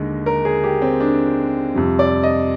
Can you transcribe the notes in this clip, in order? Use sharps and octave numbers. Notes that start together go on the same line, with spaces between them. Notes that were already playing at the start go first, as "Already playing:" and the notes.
Already playing: D#2 D3 G#3
A#4
G#4
G4
C4
D4
F2 C3 G3
D5
D#5